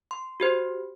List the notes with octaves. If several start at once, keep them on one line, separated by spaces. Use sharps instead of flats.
C6
F#4 G4 C5